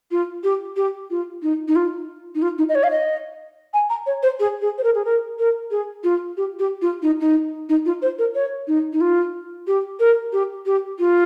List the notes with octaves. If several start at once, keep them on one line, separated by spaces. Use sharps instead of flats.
F4
G4
G4
F4
D#4
D#4
F4
D#4
F4
D#4
D#5
C#5
F5
D#5
G#5
A#5
C#5
C5
G#4
G#4
C5
A#4
G#4
A#4
A#4
G#4
F4
G4
G4
F4
D#4
D#4
D#4
F4
C5
A#4
C#5
D#4
D#4
F4
G4
A#4
G4
G4
F4